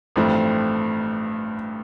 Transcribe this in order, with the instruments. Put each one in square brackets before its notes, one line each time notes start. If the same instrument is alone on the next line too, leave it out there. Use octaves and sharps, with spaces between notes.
[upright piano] A1 G2 F3 C4 E4 [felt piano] A3